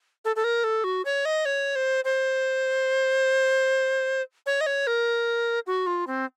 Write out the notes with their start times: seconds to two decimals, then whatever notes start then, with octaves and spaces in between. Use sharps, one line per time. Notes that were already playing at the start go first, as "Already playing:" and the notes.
0.25 A4
0.36 A4
0.44 A#4
0.64 A4
0.84 F#4
1.05 C#5
1.25 D#5
1.45 C#5
1.75 C5
2.04 C5
4.46 C#5
4.61 D#5
4.66 C#5
4.87 A#4
5.67 F#4
5.86 F4
6.07 C4